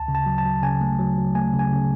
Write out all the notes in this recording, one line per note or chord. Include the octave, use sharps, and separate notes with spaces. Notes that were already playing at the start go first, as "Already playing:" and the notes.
Already playing: D2 A5
C#3
A5
F#3
A5
F#3
C#3 G#5
A3
F#3
F#3
A3 G#5
C#3
G#5
C#3